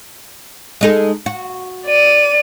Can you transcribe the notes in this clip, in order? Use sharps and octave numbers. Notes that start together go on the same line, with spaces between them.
G#3 D#4 A4
F#4
D5 D#7